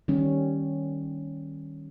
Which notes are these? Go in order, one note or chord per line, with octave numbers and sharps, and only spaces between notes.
D#3 G3 C#4